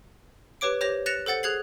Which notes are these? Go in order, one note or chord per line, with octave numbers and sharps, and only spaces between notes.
G4 B4 C#5 D6 D7
G4 C5 C#5 A#6 F7
F#6 A6 A#6 C#7 E7 F7
A4 C5 F#5 A6 C#7
G#4 F#6 G#6 C7 F#7